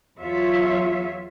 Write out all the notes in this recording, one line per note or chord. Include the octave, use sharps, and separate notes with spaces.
E2 F#3 F4 C#5 E5